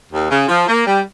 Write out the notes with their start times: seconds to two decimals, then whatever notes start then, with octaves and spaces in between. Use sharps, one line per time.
0.11 D#2
0.30 C#3
0.48 F3
0.67 A#3
0.86 G3